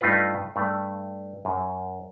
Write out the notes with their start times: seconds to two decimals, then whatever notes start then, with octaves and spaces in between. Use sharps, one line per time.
0.01 G2 A3 D#4 F4 B4
0.56 G2 A3
1.45 F#2